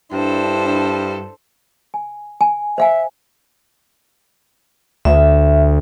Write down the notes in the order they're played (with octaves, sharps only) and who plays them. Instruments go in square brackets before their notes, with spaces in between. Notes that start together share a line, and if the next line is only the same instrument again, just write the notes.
[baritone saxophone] G2 [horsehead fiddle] D4 E4 [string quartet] A4 C5
[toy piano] G#5
G#5
[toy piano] C5 F5 G#5 [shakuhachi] E5
[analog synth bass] D2 [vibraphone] E5